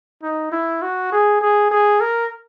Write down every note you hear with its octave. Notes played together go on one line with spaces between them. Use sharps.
D#4
E4
F#4
G#4
G#4
G#4
A#4